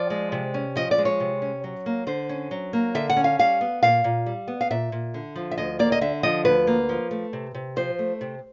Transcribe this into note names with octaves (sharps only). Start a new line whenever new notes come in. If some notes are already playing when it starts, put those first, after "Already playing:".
Already playing: F3 D5
G#3
C3
C#4
F3 D#5
D5
G#3
C#5
C3
C#4
F#3
A#3
D3 C5
C#4
F#3
A#3
D3 E5
F#5
C#4
F5
G3 F5
B3
A#2 F5
A#2
G3
B3
F5
A#2 E5
A#2
D3
F3
E5
D2 D#5
A#3 D5
D#5
D3 E5
F3 D#5
D2 B4
A#3
F3
A3
C3
C3
F3 C5
A3
C3